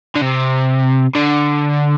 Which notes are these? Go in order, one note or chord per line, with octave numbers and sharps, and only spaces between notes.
D3
C3
D3